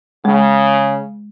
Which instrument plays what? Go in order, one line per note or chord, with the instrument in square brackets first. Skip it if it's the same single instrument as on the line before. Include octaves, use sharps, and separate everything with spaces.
[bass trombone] C#3 [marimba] G#3